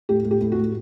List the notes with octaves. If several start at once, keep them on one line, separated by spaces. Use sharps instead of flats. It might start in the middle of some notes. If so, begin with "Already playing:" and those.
A2 G4
A2
G4
A2
F#4
A2